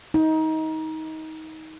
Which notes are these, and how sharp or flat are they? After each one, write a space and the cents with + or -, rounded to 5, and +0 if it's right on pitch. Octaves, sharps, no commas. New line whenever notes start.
D#4 +25